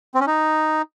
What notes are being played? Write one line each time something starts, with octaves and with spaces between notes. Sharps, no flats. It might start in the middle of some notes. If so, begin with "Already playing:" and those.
C4
C#4
D#4